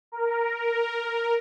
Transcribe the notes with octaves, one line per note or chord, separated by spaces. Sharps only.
A#4